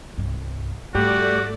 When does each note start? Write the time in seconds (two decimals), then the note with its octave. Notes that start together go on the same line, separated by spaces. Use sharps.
0.18 C2 G2
0.95 G#2 G3 A3 F#4 G4 D5